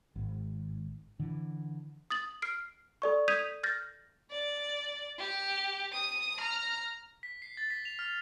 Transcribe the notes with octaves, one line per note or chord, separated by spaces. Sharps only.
G#1
D3 E3
D#6 A6 F#7
F6 C7 D7
A4 D5 C#6
D#6 G6 G#6 B6 D#7 F7
F6 G6 A6 A#6
D5
G4
D#6 D#7
A#5 F6
B6
C7
A6
B6
F7
F6